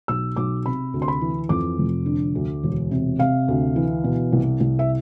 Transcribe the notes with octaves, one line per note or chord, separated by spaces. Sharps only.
B1 E6
B1 D6
C3 B5
D2
C6
B5
E3
F2 D6
F1
D3
D2
E1
C3
C3 F5
D2
E3
B2
C2
C2
E5